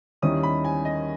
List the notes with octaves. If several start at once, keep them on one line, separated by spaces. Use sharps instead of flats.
D#2 D#3 G3 C#4 E4 D#6
B5
G#5
D#5